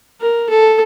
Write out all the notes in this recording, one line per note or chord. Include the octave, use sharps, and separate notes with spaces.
A#4
A4